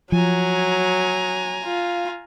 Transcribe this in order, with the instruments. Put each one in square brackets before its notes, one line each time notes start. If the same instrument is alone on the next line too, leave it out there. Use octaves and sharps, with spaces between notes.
[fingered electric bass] F3 [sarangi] F#3 [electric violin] G#5 A#5
[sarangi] F4